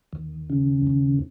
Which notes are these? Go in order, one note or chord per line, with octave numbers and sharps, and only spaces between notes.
D#2
C#3
D#2